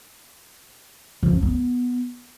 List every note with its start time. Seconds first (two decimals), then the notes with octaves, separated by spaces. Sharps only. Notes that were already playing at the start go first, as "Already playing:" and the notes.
1.23 F3
1.33 C#4
1.42 B3